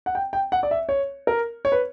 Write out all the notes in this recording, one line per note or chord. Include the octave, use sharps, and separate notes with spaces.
F#5
G5
G5
F#5
D5
E5
C#5
A#4
C#5
B4